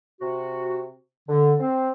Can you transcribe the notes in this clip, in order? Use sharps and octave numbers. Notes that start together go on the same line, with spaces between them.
C3 F#4
D3
C4